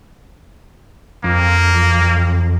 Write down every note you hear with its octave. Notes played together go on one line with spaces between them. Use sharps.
F2 A#3